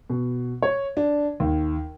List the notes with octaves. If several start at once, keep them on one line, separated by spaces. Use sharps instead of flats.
B2
C#5
D4
D#2